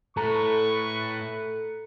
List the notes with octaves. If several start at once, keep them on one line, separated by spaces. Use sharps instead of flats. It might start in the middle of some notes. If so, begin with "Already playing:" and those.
A2 A4 B4 A#5 C#6 C#7